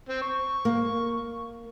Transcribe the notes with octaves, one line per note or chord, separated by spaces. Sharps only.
C4
C#6
A#3